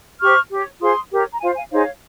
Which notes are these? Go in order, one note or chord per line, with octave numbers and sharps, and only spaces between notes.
G4 C5 C#6 F6
G4
C#5
F4 G#4 C5 C6 D#6
G4 A#4 C#5
A#5
F4 C5 F5 G#5
F5 G#5
D#4 G#4 C5 C#5 F5